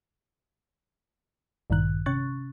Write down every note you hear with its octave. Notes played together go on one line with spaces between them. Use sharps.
A1 G2 A#2 D#3 F#6
C3 C#4 C#6 F#6 A6